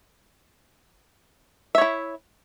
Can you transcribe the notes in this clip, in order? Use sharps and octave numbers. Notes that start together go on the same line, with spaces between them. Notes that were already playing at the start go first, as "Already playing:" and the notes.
E4 C#5 E5